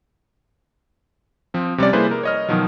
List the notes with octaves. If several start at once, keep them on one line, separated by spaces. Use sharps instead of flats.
F3 C4
C3 G3 C#4 D5
G3 A#3 E4 G#4 B4 C5
A#4
C#5 D#5 F6
B2 D#3 F3 F#3